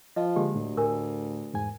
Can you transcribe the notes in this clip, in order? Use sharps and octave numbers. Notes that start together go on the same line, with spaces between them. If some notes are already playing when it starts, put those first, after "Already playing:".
F3 D#5
D3 G#3 A#3 G4
D2 A2
A2 A#4 G#5
E2 G#2 G#5